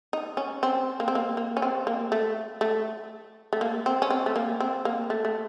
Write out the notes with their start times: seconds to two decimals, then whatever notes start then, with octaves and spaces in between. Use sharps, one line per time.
0.13 D#4
0.37 C#4
0.63 C4
1.00 A#3
1.08 C4
1.15 A#3
1.37 A#3
1.57 C#4
1.62 C4
1.87 A#3
2.12 A3
2.61 A3
3.53 A3
3.61 A#3
3.86 C4
4.02 C#4
4.10 C4
4.26 A3
4.36 A#3
4.60 C4
4.85 A#3
5.10 A3
5.25 A3